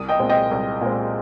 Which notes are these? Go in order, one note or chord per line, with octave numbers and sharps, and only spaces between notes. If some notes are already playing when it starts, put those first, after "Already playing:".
Already playing: C2 D#6
D#5 G5
A#2 G#3 C4
D#5 G5
C2
A#2 G#3 C4